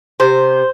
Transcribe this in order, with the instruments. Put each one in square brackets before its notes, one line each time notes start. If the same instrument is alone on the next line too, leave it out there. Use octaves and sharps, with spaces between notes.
[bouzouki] C3 C5